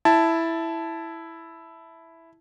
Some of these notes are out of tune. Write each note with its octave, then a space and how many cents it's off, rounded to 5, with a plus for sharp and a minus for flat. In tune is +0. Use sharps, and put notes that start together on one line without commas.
E4 +0 A5 +0